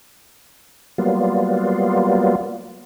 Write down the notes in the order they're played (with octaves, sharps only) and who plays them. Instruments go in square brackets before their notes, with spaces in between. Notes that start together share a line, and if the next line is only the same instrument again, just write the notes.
[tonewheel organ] F#3 G3 A#3 B3 F4